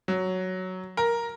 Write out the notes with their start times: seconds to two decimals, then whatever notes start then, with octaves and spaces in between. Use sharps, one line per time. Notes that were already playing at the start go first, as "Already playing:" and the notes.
0.08 F#3
0.97 A#4